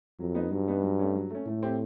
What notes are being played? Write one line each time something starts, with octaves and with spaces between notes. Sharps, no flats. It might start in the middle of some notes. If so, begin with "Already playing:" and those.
F2 F#3
B3 D#4
G2 F#3
B3 D#4
F#3
A3 C#4
F#3
A3 C#4
A2 A3
C4 E4 G4